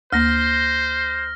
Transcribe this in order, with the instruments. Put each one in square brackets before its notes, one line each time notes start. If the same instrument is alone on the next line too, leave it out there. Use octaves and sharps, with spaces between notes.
[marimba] D2 A#3 [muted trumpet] C5 [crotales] F6 A#6